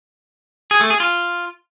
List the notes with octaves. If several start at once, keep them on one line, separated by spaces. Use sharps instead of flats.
G#4
A3
G#4
F4